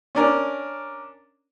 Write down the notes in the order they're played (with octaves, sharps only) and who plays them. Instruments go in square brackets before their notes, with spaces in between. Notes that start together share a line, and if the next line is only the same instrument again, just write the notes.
[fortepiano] C#4 D4 A#4